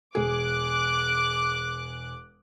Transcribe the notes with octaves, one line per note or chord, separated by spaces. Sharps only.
E1 G#4 D6 F#6